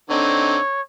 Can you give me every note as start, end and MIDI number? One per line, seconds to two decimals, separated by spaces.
0.10 0.57 50
0.10 0.57 60
0.10 0.57 63
0.10 0.81 73